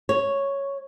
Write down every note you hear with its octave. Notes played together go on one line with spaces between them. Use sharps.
C#5